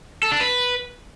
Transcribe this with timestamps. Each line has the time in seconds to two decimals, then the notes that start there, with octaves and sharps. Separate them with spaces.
0.23 A4
0.32 D4
0.40 B4